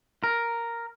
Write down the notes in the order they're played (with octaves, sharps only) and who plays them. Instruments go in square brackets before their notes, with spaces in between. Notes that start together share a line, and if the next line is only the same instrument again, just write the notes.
[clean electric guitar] A#4